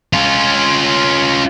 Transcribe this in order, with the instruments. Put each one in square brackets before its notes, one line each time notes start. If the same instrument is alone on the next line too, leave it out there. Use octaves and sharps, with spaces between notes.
[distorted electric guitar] C#4 F4